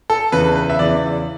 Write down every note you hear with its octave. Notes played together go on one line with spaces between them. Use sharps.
A4
E2 C#3 E3 B4
B4
E5
E2 C#3 E3 D5